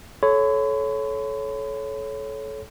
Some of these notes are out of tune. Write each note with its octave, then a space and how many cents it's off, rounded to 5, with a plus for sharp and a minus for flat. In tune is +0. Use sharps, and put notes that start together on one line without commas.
A4 -25 C#5 +0 B5 +40